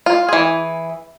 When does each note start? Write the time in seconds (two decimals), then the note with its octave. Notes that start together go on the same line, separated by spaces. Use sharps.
0.06 F4
0.29 E3 G#4